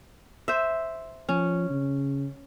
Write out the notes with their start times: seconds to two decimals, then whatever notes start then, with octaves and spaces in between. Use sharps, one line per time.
0.48 C5 E5
1.29 F3 C#4
1.70 C#3